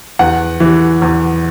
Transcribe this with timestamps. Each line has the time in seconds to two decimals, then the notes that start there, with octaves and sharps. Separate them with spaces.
0.19 E2 F#5
0.60 E3
1.02 E2